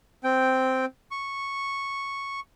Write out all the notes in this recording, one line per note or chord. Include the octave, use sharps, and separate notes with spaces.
C4 G5
C#6